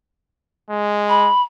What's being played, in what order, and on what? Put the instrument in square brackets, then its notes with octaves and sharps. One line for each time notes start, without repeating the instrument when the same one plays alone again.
[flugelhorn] G#3
[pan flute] B5